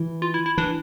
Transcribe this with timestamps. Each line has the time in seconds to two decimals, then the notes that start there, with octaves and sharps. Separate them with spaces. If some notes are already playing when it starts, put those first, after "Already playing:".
Already playing: E3
0.22 F4
0.34 E4
0.46 E4
0.58 E3 D4